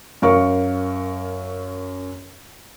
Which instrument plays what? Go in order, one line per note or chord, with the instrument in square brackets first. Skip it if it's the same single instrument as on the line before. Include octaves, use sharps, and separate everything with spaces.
[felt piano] F#2 A#4 F5 C#6